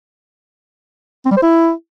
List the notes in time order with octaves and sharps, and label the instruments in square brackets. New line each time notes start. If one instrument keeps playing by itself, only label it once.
[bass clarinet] C4
G3
C5
E4